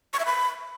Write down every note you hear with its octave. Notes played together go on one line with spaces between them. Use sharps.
C#6
E5
B5